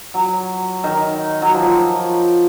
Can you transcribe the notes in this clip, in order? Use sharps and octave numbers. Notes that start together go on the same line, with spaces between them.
F#3
D#3
F#3
F3